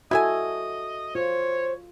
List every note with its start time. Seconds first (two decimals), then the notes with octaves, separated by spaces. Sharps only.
0.11 E4 F#4 A4 D#5 E5 G#5
1.15 F4 C5 C#5